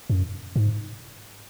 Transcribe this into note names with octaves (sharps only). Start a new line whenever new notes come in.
F#2
G#2